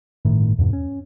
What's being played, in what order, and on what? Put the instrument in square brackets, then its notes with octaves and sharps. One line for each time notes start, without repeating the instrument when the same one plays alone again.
[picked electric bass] G1 A2 D#3
E2 G2 B2
C#4